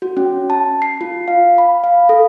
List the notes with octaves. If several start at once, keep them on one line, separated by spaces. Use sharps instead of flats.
F#4
C#4
A5
C7
F4
F5
B5
F5
A4